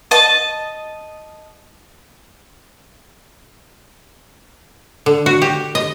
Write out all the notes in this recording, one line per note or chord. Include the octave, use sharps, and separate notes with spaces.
D#5 A5
D3
F#4
G4
D#5